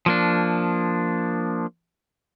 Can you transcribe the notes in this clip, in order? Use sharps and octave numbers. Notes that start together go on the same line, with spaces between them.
F3 A#3 D4